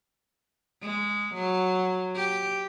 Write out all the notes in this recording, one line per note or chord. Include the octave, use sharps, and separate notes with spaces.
G#3
F#3
G4